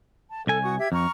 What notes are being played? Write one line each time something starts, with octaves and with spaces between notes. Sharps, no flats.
A5
C2 A4 G#5
F#4 C#6 D#6
G4 E5 G#6
F2 A#5 C#6 F6